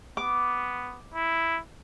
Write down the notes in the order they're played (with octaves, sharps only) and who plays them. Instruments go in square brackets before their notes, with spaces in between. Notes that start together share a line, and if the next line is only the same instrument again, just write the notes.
[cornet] B3 [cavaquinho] D6
[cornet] E4